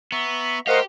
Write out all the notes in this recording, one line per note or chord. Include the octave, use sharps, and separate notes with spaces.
B3 E5 A#5 C#6
A3 G4 A#4 C5 D#5 F5 F#5